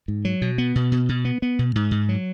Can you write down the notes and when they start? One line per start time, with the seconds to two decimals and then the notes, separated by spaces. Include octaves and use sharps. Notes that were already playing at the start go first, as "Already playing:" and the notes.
0.08 G#2
0.25 F#3
0.42 B2
0.58 B3
0.76 B2
0.92 B2
1.09 B2
1.25 B3
1.42 B3
1.59 B2
1.75 G#2
1.91 G#2
2.09 F#3